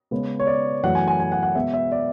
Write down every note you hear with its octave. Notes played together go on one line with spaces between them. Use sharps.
C#3 G#3 B3
C#5
D5
F#2 E3 A3 F#5
G#5
G#5
G#5
F#5
F#5
B2 G#3 B3 E5
E5
D5